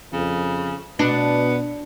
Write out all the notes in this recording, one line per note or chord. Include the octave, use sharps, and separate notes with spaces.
F2 C#3
B2 B3 D4